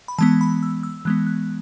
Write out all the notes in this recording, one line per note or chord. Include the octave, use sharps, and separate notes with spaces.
B5
E3 G#3 B3 A5
B5
E6
E6
E3 G#3 B3 F#6
F#6